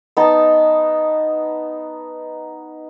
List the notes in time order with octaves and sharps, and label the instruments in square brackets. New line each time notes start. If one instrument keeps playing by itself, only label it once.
[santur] B3 D#4 A5